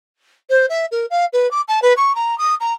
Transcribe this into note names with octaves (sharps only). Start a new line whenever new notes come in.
C5
E5
A#4
F5
B4
D6
A5
B4
C#6
A#5
D#6
A#5